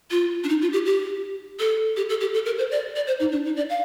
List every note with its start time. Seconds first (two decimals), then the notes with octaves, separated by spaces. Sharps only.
0.11 F4
0.44 D4
0.49 D#4
0.61 F4
0.73 G4
0.86 G4
1.60 A4
1.97 G4
2.09 A4
2.21 G4
2.34 A4
2.46 A#4
2.58 C5
2.71 D5
2.96 D5
3.07 C5
3.20 D#4
3.32 D4
3.45 D#4
3.57 D5
3.70 F5